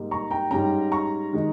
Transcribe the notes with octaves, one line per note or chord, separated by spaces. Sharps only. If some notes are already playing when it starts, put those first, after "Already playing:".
Already playing: G#2 G3 A#3 D#4
A#5 C#6
G5 A#5
G#2 G3 C#4 G5 A#5
A#5 C#6
D#3 G#3 D#4